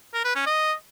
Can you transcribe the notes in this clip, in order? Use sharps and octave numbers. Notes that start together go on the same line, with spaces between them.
A#4
B4
C#4
D#5